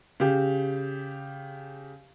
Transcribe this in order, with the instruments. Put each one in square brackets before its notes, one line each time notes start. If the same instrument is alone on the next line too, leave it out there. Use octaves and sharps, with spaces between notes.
[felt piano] C#3 G4